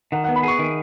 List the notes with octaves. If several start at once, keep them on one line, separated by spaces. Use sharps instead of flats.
D#3 F#5
F#5
B3
B5
G#4 C#6
D#3